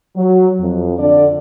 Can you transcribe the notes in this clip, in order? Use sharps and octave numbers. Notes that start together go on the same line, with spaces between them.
F#3
F2
D3 D5